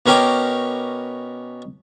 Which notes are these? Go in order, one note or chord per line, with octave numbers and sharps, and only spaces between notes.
B2 C#4 A#4 G5 B5 D6